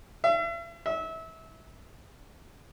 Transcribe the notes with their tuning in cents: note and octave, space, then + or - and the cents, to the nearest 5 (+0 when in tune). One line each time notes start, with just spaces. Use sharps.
E5 +40
E5 -25